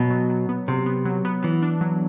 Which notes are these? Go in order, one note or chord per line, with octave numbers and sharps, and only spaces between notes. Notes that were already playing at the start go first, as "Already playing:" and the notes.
Already playing: B2 F#3
F#3
F#3
B3
C3 F#3
B3
F#3
B3
E3 B3
D4
F#3